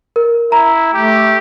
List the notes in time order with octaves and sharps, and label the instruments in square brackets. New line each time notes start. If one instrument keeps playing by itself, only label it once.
[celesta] A#4
[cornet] E4 [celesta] A#5
[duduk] A3 [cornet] G4